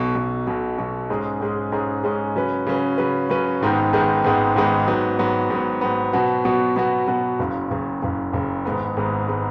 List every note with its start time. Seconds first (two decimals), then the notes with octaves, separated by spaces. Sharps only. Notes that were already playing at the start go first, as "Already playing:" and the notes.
Already playing: B1 B2 F#3
0.15 B1 B2 F#3
0.46 B1 B2 F#3
0.78 B1 B2 F#3
1.10 G#2 G#3 C#4 G#4
1.41 G#2 G#3 C#4 G#4
1.72 G#2 G#3 C#4 G#4
2.03 G#2 G#3 C#4 G#4
2.35 C#3 F#3 C#4 B4
2.67 C#3 F#3 C#4 B4
2.98 C#3 F#3 C#4 B4
3.29 C#3 F#3 C#4 B4
3.61 G#1 G#2 D#3 G#3 B3
3.93 G#1 G#2 D#3 G#3 B3
4.24 G#1 G#2 D#3 G#3 B3
4.55 G#1 G#2 D#3 G#3 B3
4.88 G#2 F#3 B3
5.19 G#2 F#3 B3
5.50 G#2 F#3 B3
5.81 G#2 F#3 B3
6.13 B2 F#3 B3 F#4
6.45 B2 F#3 B3 F#4
6.76 B2 F#3 B3 F#4
7.07 B2 F#3 B3 F#4
7.39 F#1 F#2 C#3
7.71 F#1 F#2 C#3
8.02 F#1 F#2 C#3
8.33 F#1 F#2 C#3
8.65 G#1 G#2 G#3 B3
8.96 G#1 G#2 G#3 B3
9.28 G#3 B3